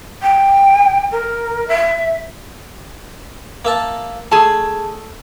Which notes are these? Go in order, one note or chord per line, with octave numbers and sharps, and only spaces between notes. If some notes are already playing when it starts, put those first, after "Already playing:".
G5
A#4
E5
A#3 E5 A5
A3 G#4 A5